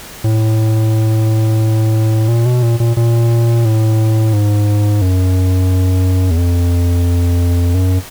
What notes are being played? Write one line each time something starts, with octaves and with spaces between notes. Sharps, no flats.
A2
A#2
B2
A#2
A#2
A#2
A2
G#2
F#2
E2
F2
F#2